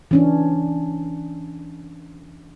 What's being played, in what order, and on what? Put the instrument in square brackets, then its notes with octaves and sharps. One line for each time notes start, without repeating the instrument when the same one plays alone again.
[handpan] E3 C#4 D4